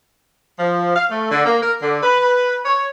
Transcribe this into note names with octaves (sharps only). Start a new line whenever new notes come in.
F3
F5
A3
D3
A#3
A#4
D3
B4
C#5